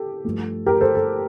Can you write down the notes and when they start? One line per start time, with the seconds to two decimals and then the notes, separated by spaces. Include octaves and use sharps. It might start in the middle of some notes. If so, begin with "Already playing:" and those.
Already playing: G4 A4
0.25 G2 F3 A3
0.66 G4 A#4
0.81 A4 C5
0.95 A4